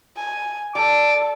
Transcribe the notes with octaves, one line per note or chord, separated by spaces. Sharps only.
G#5
G3 A4 D6